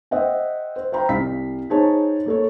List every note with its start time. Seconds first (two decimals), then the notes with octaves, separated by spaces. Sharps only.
0.11 C5 D#5 E5 F#5 G5
0.76 C5
0.92 C5 F5 G5 A#5 B5
1.09 C2 F5 B6
1.70 D#4 G#4 C5 C#5 A5
2.26 A#3 A4 C#5